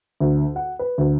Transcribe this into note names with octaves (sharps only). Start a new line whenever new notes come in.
D2
F#5
B4
D2